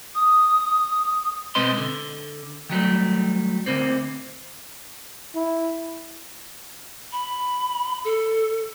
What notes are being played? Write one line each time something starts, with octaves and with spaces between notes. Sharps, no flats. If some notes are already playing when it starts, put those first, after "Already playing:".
D#6
B2 G#3 C4 B4 D#5 C6
D3
D#3 F#3 G3 A3
D2 D3 A#3 C4
E4
B5
A4